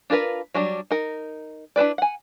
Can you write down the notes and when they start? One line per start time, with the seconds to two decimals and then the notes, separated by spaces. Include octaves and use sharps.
0.10 D4 F4 A#4 B4
0.54 F#3 G3 D4
0.91 D#4 A#4
1.76 D4 E4 B4 D5
1.98 F#5 G#5